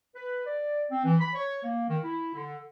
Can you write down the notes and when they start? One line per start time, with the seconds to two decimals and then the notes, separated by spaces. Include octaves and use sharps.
0.15 B4
0.46 D5
0.91 C4
1.05 E3
1.20 B5
1.35 C#5
1.64 A#3
1.89 D#3
2.04 E4
2.35 D3